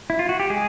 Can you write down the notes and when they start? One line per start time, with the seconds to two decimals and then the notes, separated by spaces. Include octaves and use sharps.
0.10 E4
0.19 F4
0.29 F#4
0.39 G4
0.50 G#3 G#4